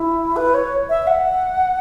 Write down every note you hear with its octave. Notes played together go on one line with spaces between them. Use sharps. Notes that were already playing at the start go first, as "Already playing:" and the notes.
Already playing: E4
B4
C#5
E5
F#5